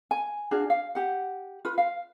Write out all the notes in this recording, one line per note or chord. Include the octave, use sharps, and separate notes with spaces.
G#5
D4 F4 F#4 G#4
F5
G4 F#5
F4 B4
F5